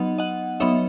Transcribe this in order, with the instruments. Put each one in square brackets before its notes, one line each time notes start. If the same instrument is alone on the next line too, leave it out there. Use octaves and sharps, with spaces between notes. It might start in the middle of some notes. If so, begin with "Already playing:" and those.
Already playing: [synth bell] F#3 B3 D#4 D#5 F#5
D#5 F#5
F#3 B3 D#4 C#5 E5